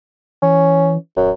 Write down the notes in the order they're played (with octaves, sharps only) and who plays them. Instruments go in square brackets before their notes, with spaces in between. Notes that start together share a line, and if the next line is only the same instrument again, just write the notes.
[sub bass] E3 [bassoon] C#4
[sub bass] D#1 [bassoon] F#2